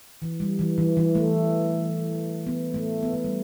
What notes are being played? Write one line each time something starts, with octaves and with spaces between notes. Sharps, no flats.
E3
G3
E3
E3
E3
A3
B3
A3
B3
A3
G3